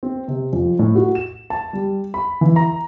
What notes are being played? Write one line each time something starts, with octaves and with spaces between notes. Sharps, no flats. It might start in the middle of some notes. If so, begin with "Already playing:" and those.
C4
C3
F2
A2
F#4
E7
A5
G3
B5
E3
A#5